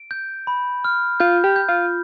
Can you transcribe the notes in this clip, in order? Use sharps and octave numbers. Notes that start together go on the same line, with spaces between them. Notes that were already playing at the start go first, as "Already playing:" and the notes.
Already playing: D7
G6
B5
F6
F4 G6
G4
G6
F4